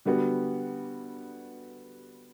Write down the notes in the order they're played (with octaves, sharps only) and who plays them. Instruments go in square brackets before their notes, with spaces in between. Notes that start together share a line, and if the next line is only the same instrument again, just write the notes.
[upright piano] D3 G3 B3 F#4